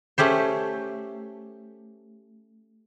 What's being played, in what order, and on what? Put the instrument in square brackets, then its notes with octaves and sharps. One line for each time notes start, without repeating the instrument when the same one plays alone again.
[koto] A3 C#4 G4 C5